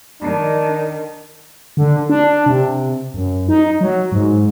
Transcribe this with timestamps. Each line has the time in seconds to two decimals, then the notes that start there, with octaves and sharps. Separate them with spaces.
0.21 D#3 D4
1.77 D3
2.10 D4
2.46 C3
3.14 F#2
3.49 D#4
3.81 F#3
4.12 G#2